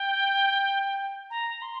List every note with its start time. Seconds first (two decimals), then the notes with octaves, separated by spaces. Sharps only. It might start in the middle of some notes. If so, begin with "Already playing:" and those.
Already playing: G5
1.30 A#5
1.62 C6